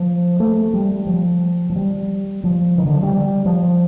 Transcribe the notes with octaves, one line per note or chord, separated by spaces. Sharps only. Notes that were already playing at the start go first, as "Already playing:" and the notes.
Already playing: F3
A3
G3
F3
F3
G3
F3
D#3
D3
F3
G3
F3